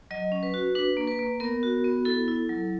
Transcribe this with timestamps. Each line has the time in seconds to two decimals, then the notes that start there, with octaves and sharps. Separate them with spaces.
0.11 F#3 D#5
0.32 C#4
0.43 B4
0.54 F#4
0.75 D4 B4
0.97 A#3
1.08 B4
1.19 A#3
1.40 B3 A#4
1.63 F#4
1.85 B3
2.05 E4 A4
2.28 E4
2.49 F#3